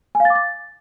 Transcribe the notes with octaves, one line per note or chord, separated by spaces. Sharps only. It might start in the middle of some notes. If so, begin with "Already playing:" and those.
G#5
F5
A6
D6
A6